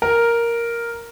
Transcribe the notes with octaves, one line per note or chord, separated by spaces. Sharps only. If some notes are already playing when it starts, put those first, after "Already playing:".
A#4